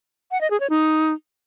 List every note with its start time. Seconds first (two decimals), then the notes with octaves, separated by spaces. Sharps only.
0.31 F#5
0.41 D#5
0.51 G#4
0.60 C#5
0.70 D#4